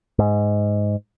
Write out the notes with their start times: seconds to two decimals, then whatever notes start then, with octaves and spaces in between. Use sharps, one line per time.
0.19 G#2